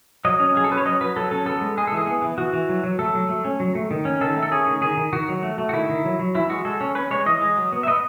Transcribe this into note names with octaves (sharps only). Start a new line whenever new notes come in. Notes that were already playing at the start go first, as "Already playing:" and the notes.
F#3 D#5
C#4
F#3 G#4
A4
C#4 B4
C#5
F#3 D#5
F#3 B4
F#3 A4
C#4 A4
B3 A4
G#3
G#3 G#4
A4
E3 G#4
B3
E3
E3 F#4
E3
F#3
F#3
A3 A4
F#3
A3
C#4
F#3
A3
D#3
C#4
D#3 A4
A3
A4
C#4 G#4
D#3
D#3 G#4
D#3
D#3 F#4
F#3
A3
A3
F#4
D#3 E4
D#3
F#3
F#3
E3 E4
G#3 F#4
G#3 A4
C#4
C#4 B4
G#3 C#5
E3 D#5
G#3
F#3
B3
E5
B3 D#5